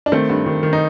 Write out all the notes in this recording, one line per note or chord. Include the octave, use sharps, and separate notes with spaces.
D4
D#3 A3 C4
G2
D#3
D#3
D#4